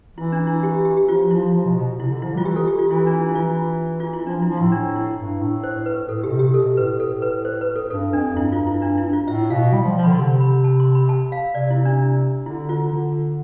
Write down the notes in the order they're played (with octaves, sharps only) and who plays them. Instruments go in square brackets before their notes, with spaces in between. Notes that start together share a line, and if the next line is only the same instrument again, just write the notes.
[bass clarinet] E3 [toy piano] E4
[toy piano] D4
E4
G4
G4
G4
[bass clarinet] F3 [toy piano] F4
[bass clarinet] F3 [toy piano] E4
[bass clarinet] F3
B2
B2
[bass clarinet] C3 [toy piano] E4
[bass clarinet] D3
[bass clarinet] F3 [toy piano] E4
[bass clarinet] G3 [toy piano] F4
[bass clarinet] E3 [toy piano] G4
[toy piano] A4
G4
F4
[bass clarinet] E3 [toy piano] E4
[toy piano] D4
E4
E4
[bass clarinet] E3 [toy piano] F4
[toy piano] F4
E4
[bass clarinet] F3 [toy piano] D4
[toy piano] E4
[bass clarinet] F3
[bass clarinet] A2 [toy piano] E4
[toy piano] D4
E4
[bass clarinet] G2
A2
[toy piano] C5
B4
[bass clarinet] A2 [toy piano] A4
[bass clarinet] B2 [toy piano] G4
[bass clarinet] C3
[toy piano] G4
[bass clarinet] B2 [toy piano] A4
[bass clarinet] A2 [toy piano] B4
[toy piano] A4
B4
C5
B4
A4
[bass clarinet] G2 [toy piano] A4
[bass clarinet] F2 [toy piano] D4
[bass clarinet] G2 [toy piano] E4
[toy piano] F4
E4
D4
E4
F4
[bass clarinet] A2 [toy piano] E5
[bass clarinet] B2 [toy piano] F5
[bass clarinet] G3 [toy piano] G5
[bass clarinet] F3
F3
[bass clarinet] D3 [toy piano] B5
[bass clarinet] C3 [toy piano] C6
[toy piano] B5
A5
C6
B5
A5
F5
[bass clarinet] C3 [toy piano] D5
[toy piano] E4
D4
[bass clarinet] D3 [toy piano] E4
[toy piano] F4
[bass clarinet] D3